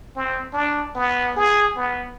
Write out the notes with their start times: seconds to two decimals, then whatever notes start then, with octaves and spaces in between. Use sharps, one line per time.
0.16 C4
0.53 D4
0.95 B3
1.36 G#4
1.77 B3